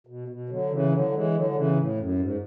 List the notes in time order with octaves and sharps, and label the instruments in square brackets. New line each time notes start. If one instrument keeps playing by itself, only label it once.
[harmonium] B2
B2
D3 F#3
C#3 E3
D3 F#3
E3 G#3
D3 F#3
F#3
C#3 E3
A2
F#2
G#2